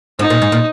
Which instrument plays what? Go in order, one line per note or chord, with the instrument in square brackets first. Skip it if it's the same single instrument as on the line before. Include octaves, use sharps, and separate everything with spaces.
[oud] G#2 [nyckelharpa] D#4
[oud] A#2
G#2
A#2